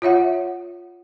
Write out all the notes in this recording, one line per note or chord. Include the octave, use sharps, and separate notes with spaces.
F4 C#5 E5 F#5